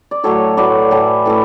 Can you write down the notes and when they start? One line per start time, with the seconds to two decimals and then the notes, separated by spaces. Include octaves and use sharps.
0.11 D5
0.23 A2 F#3 A3 A4 C#5
0.57 A2 F#3 A3 B4 D5
0.91 A2 E3 A3
1.26 A2 E3 A3